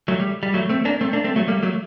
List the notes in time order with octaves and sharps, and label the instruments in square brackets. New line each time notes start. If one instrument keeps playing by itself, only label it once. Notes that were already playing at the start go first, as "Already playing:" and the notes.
[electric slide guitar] F#3 A3
G3
G3
F#3 A3
A3 C4
A#3 D4
A3 C4
A#3 D4
A3 C4
F#3 A3
G3 A#3
F#3 A3